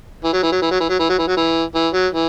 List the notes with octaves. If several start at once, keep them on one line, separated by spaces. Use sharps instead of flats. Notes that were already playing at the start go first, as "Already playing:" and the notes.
E3
F#3
E3
F#3
E3
F#3
E3
F#3
E3
F#3
E3
F#3
E3
E3
F#3
E3